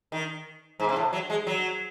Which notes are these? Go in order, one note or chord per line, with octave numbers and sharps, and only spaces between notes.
D#3
G#2
C3
A2
F#3
G#3
F#3